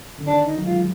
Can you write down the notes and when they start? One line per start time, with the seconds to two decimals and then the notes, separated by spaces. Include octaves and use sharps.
0.18 D3
0.26 D#3 D4
0.46 D#4
0.55 F#3
0.62 G#3
0.65 F4
0.70 F#3